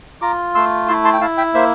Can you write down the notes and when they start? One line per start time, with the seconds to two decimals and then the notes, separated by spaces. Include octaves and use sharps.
0.22 F4 A#5 D6
0.55 A3 C6 E6
0.88 E4 A5 C6
1.05 A5 C6
1.13 G5
1.21 E4 F5 A5
1.38 E5 G5
1.54 A#3 C5 E5